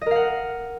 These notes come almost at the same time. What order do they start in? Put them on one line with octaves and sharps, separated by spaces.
D#5 A#4 F5 F#5